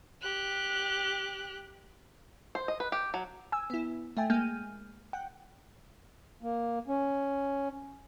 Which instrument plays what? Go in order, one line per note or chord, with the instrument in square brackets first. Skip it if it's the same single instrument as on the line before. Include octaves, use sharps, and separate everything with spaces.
[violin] G4 F#6
[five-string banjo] C5
D#5
B4
G4
F#3
[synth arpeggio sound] G#5 E6
B3 E4
A3 E5 G5 G#5
G#3 A#3 G#5 F6 G6 D#7
F#5 G5
[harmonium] A#3
C#4